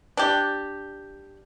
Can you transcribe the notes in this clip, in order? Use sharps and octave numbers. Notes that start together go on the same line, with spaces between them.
D4 G4